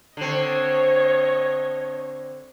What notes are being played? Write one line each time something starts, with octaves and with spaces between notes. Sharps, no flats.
D3 C4 C#5 D#5